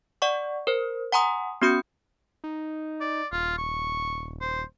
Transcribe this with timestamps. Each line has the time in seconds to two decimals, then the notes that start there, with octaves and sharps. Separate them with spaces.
0.22 D5 F#5 C#6
0.67 A#4 C5
1.12 F#5 G#5 A#5 C6 D#6
1.62 B3 C#4 F#4 D#6 G6 C#7
2.44 D#4
3.01 D5
3.32 D#1 F4
3.58 C#6
4.41 C5